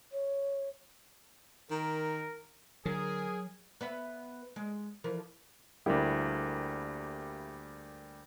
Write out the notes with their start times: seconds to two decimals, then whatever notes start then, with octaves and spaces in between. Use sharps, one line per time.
0.12 C#5
1.71 D#3 A#4
2.86 D3 F#3 G#4 A#4
3.81 B3 B4 E5
4.56 G#3
5.04 E3 F3 A#4
5.86 D2 G3 A#3 E4 G4 A#4